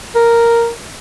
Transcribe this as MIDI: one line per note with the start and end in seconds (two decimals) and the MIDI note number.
0.15 0.70 70